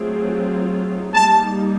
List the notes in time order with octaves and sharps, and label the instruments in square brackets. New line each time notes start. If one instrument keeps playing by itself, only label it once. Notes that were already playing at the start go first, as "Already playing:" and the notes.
Already playing: [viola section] F#3 A3 C4 F4 G#4
[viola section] G3 A#3 D#4 [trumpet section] A5